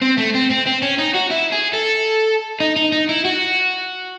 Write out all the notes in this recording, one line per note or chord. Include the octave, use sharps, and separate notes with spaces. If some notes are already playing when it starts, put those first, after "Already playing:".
C4
A3
C4
C4
C4
C#4
D#4
F#4
E4
G#4
A4
D#4
D#4
D#4
E4
F#4